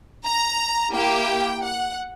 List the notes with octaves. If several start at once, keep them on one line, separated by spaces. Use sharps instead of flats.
A#5
A#3 E4 G4 G5
F#5